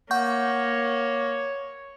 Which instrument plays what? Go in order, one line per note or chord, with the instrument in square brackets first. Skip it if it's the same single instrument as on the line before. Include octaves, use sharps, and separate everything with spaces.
[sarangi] A#3 [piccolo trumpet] C#5 [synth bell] F#5 C#6 G6